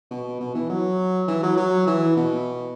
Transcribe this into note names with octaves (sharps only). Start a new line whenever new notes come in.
B2
B2
E3
F#3
E3
F#3
F#3
E3
B2